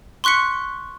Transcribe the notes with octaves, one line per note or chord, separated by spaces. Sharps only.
C6 C#6 F#6 B6 C#7